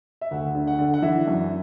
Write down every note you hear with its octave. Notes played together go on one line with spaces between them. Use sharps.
E5
D2 F#5
D3
F#5
D3
F#5
E3 E5
F#2